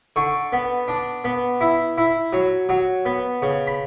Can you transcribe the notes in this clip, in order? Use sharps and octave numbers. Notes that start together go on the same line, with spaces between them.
D3 C#6
B3
D4
B3
E4
E4
F#3
F#3
B3
C#3
B5